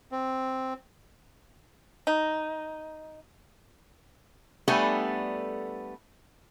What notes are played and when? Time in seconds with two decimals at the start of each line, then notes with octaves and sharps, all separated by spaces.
0.12 C4
2.07 D#4
4.68 G3 A3 B3 D4 A4 G#5